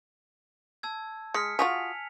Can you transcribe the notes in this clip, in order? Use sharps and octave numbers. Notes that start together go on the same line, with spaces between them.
A5 E6 G#6
G#3 F6 B6 C#7
F4 F#4 G#4 G#5 B6 F7